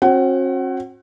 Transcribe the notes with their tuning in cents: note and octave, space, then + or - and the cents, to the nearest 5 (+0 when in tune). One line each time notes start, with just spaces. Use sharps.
C4 +45 F#4 -35 F#5 +30